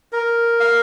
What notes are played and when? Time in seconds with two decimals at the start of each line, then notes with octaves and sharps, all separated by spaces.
0.13 A#4
0.60 F5